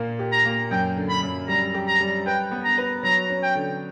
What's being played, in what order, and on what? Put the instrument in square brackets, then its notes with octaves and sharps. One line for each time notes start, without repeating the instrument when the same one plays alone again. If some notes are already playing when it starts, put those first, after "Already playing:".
Already playing: [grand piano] A#2 A#3
G4
[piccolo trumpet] A#5
[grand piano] A#3
[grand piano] F#2 [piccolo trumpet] G5
[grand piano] D3
[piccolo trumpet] B5
[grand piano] F#2
[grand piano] G3 [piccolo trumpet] A#5
[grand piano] G4
[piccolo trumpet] A#5
[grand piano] G3
[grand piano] B4 [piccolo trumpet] G5
[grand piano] B3
[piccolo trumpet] A#5
[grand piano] B4
[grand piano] F#3 [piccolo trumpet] A#5
[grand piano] C#4
[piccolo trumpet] G5
[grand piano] D3